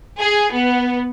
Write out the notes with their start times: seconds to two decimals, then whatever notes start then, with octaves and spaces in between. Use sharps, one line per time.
0.19 G#4
0.52 B3